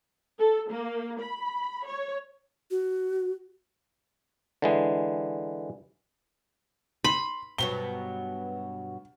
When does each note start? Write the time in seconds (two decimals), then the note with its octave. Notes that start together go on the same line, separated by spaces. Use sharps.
0.39 A4
0.71 A#3
1.20 B5
1.87 C#5
2.71 F#4
4.62 D3 E3 G#3
7.04 B5 C6
7.58 G2 B2 F#3 G7